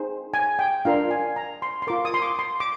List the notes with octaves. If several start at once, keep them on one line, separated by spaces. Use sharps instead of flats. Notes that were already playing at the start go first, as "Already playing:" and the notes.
Already playing: D#4 G#4 C5
G#5
G5
D4 F4 A#4 F5
G#5
A#5
C6
C6
F4 A#4 D6
D#6
C6
D6
C6
D6